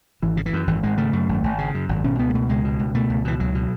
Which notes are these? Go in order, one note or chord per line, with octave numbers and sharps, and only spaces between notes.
G#1 E3
C#3
E3
F#2
G#1 E3
G#1 G#3
C#3 A3
F#2
G#1
G#1
C#3
F#2
G#1
B2 C#4
C#2 B3
G#3
B2 A3
C#2 G#3
B2
C#2
B2 A3
C#2
B2 E3
C#2 F#3
B2